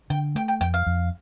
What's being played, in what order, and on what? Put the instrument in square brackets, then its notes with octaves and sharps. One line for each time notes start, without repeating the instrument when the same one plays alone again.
[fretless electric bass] D3 [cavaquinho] G5
[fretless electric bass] A3 [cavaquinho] G5
[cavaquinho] G5
[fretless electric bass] F2 [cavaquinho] G5
[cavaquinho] F5
[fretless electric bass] F2